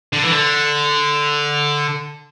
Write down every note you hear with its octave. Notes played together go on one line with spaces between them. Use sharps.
D3
E3
D3